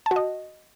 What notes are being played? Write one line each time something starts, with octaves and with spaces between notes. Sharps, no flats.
A5
F#4
D#5